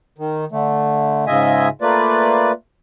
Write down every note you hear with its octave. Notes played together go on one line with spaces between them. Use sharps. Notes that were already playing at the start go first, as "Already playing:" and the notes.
D#3
D3 A3
G#2 C#3 F4 D#5 E5 G#5
A3 A#3 F4 B4 D5